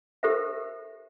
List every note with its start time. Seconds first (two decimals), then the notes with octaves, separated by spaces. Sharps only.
0.23 G4 A4 A#4 C5 E5